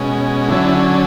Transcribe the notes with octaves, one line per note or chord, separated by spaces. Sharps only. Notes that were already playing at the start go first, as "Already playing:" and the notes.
Already playing: B2 G#3 C#4
D3 F#3 C#4 E4